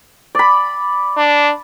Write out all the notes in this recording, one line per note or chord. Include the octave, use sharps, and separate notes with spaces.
D5 B5
D4